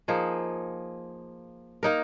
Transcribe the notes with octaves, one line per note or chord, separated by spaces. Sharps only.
F3 A#3 D#4 G#4
A#3 D#4 A#4